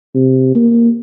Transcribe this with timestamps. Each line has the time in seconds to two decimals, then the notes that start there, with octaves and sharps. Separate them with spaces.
0.15 C3
0.55 A#3